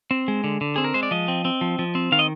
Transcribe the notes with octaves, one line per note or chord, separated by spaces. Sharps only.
C4
G#3
D3
D3
C4 G#4
A#4
G#3 C5
D5
F3 D#5
C4
C4
F3
F3
C4
D#3 F5
D#5